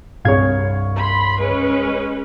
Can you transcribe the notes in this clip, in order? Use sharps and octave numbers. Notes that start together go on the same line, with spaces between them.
C2 G2 G#4 C#5 F5 G#6
B5 C6
G#3 C#4 B4